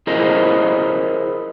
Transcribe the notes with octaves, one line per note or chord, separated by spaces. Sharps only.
E4 G#4 A#4 C5 D#5